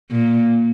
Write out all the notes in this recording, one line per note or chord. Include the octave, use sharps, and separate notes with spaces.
A#2